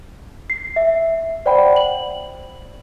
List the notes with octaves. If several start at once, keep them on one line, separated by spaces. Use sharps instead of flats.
C7
E5
C5 D5 F#5 G5 B5
F#7